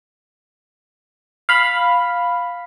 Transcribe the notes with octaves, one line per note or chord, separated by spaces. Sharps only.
F5 B5